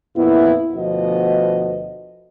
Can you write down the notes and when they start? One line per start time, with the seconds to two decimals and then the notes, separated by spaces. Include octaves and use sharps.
0.15 F2 A#2 B3 E4
0.74 D2 B2 F3 B3 F#4 D#5